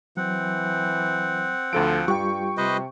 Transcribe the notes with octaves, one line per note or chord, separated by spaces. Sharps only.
E3 F#3 C4 F#5
D2 F3 A4 D7
G2 G3 F4 G4 G5 C#6
C3 B4 C5 D#5